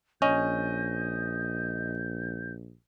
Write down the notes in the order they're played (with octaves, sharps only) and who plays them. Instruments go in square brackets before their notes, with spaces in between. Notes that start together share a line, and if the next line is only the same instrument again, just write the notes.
[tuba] A#1 [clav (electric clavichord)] C#4 [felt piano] D#5 [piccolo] G6